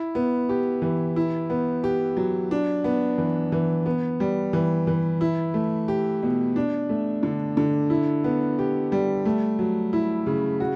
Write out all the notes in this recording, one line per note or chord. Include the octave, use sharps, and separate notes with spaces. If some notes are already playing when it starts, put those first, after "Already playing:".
Already playing: E4
B3
G4
E3
E4
B3
G4
F#3
D4
B3
E3
E3
B3
G3
E3
E3
E4
A3
G4
B2
D4
A3
D3
D3
E4
B3
G4
G3
A3
F#3
E4
C#3
F#4